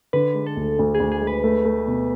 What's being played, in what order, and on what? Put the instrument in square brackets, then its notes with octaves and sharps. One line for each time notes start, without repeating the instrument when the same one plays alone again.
[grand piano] D3 [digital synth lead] B4
[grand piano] G#3
[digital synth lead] A4
[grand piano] D2
D2
[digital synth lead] G#4
[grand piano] D2
[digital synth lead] G#4
[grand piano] G#3
[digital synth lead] B4
[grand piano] A3
A3
B2